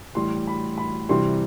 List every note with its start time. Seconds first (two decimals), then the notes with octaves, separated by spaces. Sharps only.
0.15 A2 E3 G3 C6
0.47 B5
0.78 B5
1.09 C3 E3 G3 C6